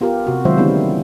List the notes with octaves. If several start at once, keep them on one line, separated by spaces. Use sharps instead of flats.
B3 F4 G4 A#4
C3 F#4
D#3 F#3 G#3 F4 C5 E5
D3 G3 A#3 B3 C#4 E4